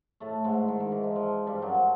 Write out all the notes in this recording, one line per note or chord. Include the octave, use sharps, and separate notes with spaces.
A2 A3
G#2 G#3
D#3
D#3
E3
F3
F3
G2 G3
F#2 F#3
F3